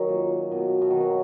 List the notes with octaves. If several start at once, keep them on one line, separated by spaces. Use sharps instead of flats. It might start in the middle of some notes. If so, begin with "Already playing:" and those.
Already playing: D#3 F#3
A#2
B2
B2
D#3
F#3